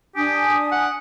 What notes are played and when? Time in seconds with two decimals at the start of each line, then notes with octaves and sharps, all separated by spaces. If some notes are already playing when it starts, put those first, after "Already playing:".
0.16 D4 G4 G#5 D#6
0.72 F#5